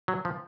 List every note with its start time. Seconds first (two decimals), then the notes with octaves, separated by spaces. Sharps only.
0.08 F#3
0.25 F3